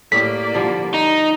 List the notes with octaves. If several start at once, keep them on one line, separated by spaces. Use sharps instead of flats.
A2 A#3 G4 D5 G5 B6
D3 F3 G3
D#4